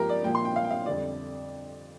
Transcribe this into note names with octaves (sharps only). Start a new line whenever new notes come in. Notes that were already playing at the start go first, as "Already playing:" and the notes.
Already playing: G2 F3 A#3 G4 A#4
D5
A#2 F3 A#3 G5
C6
G5
F5
G5
F5
F2 D3 G3 D5